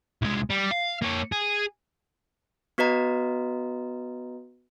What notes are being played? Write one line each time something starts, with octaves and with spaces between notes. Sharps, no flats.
C2 G#3
G3
F5
A#3 C#5
G#4
B3 F#4 B4 D#5 A#5